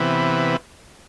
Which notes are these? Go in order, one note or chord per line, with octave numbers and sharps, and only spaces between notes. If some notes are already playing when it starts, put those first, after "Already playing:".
Already playing: C3 E3 B3